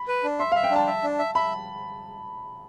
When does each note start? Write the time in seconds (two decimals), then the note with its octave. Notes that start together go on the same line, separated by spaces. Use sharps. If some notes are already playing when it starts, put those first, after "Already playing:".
Already playing: B5
0.08 B4
0.24 D4
0.39 E5 C6
0.52 E5 F5
0.64 G5
0.71 D4 A5
0.87 E5
1.03 D4
1.19 E5
1.35 E5 B5